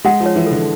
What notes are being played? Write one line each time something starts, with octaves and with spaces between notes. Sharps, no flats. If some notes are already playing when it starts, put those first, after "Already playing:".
G#3 F#5
F3
C#5
E3
D3 A4